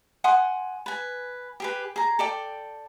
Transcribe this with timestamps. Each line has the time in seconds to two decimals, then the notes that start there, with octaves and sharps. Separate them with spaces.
0.24 F#5 G#5 C6 D#6
0.86 B4 G#5
1.60 G4 G#4 B4
1.96 G#4 A#5
2.19 A4 D5 G5